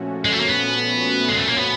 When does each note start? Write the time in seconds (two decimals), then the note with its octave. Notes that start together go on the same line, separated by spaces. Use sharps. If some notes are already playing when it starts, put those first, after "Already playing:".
Already playing: A#2 F3 A3 C#4 F#4
0.25 G#3
0.32 A3
0.40 A#3
0.48 B3
1.29 G#3
1.38 A3
1.48 A#3
1.57 B3